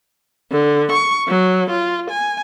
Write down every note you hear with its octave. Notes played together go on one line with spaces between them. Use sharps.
D3
C#6
F#3
F4
G#5